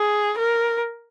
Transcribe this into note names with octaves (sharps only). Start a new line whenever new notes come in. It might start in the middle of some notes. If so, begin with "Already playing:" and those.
Already playing: G#4
A#4